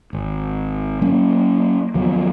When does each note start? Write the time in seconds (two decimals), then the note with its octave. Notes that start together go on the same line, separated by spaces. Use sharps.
0.13 G#1
1.01 F#3 A#3 C#4
1.94 D#2 F3 F#3 B3